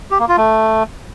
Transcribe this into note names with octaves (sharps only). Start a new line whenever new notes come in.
G4
A#3
F4
A3